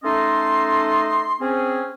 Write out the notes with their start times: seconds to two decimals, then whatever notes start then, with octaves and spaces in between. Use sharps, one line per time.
0.04 A3 C#4 D#4 A4 D#5 C6
1.40 C4 C#4 G#4